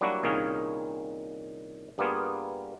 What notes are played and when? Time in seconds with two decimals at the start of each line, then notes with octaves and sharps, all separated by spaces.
0.01 F#3 G3 A#3 D4 E4 F#4
0.23 C2 A#2 D#3 C#4 G#4 F5
1.98 G2 G3 A#3 B3 F4 G#4